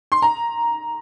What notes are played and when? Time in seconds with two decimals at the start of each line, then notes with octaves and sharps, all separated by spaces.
0.12 C6
0.22 A#5